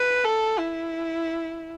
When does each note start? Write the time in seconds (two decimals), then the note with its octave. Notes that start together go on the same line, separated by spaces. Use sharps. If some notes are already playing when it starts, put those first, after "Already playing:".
Already playing: B4
0.24 A4
0.60 E4